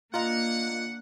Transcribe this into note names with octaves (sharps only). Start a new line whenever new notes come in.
A#3 D4 F4 D#5 F5 F#5 A#5